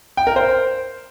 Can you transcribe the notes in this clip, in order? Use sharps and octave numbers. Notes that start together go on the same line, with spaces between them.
G5
A#4
C5